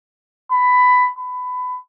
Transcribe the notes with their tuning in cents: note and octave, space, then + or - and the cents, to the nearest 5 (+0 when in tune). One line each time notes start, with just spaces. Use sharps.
B5 +15
B5 +20